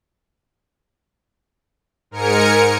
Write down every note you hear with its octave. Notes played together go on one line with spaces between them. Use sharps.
G#2 A#4 G#5 C#7